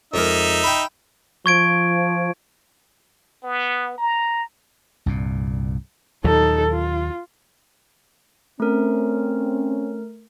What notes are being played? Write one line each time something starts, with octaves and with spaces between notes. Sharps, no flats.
F2 G#3 D#4 A#4 E5
G5 B5
F3 C#6 G#6 D7
B3
A#5
C2 G2 A#2
D#2 A#2 F#3 D#4 A4
F4
A3 C4 C#4 A#4